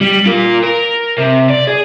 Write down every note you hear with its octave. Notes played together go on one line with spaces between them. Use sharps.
G3
F4 A#4
A#4
C3
D5
G#4